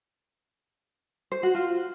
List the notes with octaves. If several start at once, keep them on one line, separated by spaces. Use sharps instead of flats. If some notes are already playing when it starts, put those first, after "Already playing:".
C5
F#4
F4